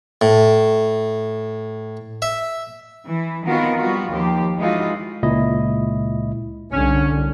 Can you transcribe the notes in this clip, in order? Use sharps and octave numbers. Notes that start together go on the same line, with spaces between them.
A2
E5
E3
D#3 B3 C4 F4 F#4 A#4
G3 B3 F4 F#4
D#2 F3 G4
E3 G#3 D#4 F4 F#4
C#2 A#2 E4 D#5
C2 D3 C#4